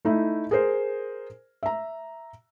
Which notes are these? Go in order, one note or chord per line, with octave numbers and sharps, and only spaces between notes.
A3 D#4 E4
G#4 A#4 C5
E5 A#5